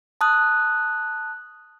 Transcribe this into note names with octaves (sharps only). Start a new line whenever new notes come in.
A5 D#6 F#6